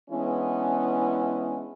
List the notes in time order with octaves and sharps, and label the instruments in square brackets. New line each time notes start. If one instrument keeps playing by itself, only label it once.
[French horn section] E3 G#3 B3 C#4 D4 E4